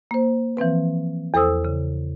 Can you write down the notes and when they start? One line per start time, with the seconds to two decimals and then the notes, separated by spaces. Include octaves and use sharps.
0.11 A#3 C5
0.57 E3 F3 C4 B4
1.34 E2 A4 C5 D#6 E6
1.65 C#3